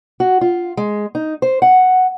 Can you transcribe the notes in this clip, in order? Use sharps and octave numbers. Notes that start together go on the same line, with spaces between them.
F#4
F4
G#3
D#4
C5
F#5